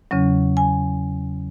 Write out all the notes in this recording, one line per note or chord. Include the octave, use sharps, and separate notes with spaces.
E2 C#3 F#3 C#4
G#5